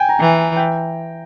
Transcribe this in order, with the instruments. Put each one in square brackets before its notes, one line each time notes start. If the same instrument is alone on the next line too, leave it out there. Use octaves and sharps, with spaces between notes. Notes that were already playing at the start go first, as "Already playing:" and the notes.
Already playing: [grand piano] G5 G#5
A#5
[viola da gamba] E3
[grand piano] G5